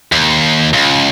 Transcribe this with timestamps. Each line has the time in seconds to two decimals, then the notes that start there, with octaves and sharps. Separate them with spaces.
0.12 D#2
0.73 C#2